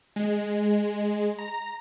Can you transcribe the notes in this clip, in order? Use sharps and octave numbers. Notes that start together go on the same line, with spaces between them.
G#3
A#5